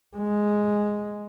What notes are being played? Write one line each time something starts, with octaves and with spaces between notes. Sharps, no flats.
G#3